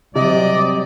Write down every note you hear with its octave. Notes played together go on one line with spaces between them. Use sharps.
C3 F#3 G3 C4 D5 D#5